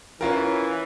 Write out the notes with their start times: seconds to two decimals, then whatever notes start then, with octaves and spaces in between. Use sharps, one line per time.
0.21 E3 C#4 F4 A#4